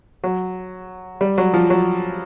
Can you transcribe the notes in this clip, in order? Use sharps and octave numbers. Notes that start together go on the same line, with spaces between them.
F#3
G3
F#3
F3
F#3